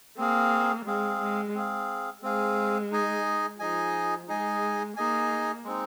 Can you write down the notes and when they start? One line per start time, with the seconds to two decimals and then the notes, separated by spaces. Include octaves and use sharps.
0.17 A#3 C4 G#4 F5
0.86 G#3 C4 G#4 F5
1.21 G#3
1.55 C4 G#4 F5
2.23 G#3 C4 G#4 F5
2.92 D#4 G#4 D#5 G#5
3.59 F3 D#4 G#4 D#5 G#5
4.28 G#3 D#4 G#4 D#5 G#5
4.96 A#3 D#4 G#4 D#5 G#5
5.65 G#3 C4 D#4